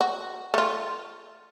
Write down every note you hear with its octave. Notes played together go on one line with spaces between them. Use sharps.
F#4
A3 F4